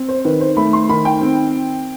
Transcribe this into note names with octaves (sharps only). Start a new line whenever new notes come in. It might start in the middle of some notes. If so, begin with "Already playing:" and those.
Already playing: C4
C5
D#3 B4
C5
A3 B5
C6
D#3 B5
G5
C4